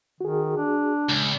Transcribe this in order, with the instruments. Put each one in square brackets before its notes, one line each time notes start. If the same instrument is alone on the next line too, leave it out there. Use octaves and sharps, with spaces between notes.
[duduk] D#3 [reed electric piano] F#4 G#4
[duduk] D4
[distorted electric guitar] C#2